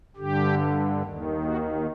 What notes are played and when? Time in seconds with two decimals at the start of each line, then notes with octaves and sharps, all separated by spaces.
0.17 G2 D3 G4
1.01 D#2 D#3
1.44 F#4